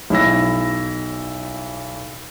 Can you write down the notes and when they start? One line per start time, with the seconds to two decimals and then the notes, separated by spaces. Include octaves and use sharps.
0.10 B1 E4 E6 A#6